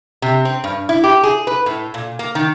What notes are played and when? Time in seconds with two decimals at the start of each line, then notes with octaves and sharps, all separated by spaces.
0.22 C3
0.45 C4
0.64 G2
0.89 E4
1.04 G4
1.23 G#4
1.47 B4
1.66 A2
1.94 A#2
2.19 A#3
2.35 D#3